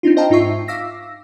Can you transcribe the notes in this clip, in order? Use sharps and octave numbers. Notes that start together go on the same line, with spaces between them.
C4 D4 D#4 F4
C5 D#5 F5 G5 A5 A#5
G#2 D#4 F4 E5 C#6 C7
F5 D6 E6 A#6 B6